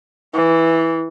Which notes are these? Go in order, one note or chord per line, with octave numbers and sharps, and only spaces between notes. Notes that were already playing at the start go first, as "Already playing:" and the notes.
E3